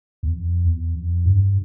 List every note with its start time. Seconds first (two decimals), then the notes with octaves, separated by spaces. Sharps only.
0.23 E2
0.33 F2
0.64 E2
0.95 F2
1.26 G2